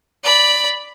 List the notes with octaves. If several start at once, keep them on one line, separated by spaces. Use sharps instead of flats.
D5 B5